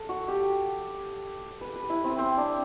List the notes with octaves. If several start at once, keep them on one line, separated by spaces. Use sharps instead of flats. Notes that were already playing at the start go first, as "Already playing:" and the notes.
Already playing: A4
F#4
G4
B4
B4
E4
C4
C4
D4